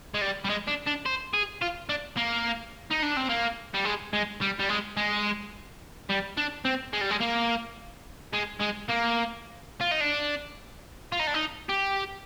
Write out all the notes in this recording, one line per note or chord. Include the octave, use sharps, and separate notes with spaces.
G#3
G3
G3
G#3
D4
D4
C5
G#4
F4
D4
A#3
D#4
D4
C4
A#3
G3
G#3
G#3
G3
G3
G#3
G#3
G3
D4
C4
G#3
G3
G#3
A#3
G#3
G#3
A#3
F4
D#4
D4
F4
D#4
D4
D#4
G4